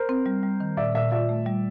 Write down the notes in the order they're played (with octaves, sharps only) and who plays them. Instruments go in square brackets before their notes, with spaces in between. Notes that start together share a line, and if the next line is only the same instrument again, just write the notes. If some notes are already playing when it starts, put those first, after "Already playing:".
Already playing: [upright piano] A#4 C5
[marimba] C4
G3
G3
D#3
[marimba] A#2 [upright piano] D5 E5
[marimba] A#2 [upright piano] D5 E5
[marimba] F4 [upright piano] D5 E5
[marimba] A3
G3